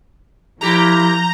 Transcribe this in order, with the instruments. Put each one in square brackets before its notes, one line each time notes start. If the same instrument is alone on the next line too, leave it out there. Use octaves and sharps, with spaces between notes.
[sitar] A#2 G4 [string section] F3 G6 [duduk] E4 [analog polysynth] A#5